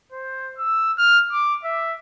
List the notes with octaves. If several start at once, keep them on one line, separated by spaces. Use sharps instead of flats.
C5
E6
F6
D6
E5